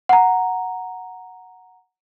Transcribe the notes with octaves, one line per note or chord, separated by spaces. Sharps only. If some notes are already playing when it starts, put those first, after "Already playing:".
F#5 A#5